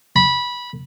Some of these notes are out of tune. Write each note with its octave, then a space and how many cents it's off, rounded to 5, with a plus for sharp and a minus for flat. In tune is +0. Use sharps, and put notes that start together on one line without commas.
B5 -15